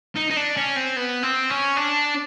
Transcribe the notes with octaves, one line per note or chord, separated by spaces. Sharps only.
D#4
D#4
D4
C#4
C4
B3
C4
C#4
D4